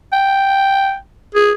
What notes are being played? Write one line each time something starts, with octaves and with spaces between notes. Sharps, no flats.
G5
G#4